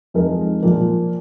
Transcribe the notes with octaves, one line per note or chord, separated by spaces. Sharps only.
F2 F3 G#3 D#4 A#4
A#2 F3 A#3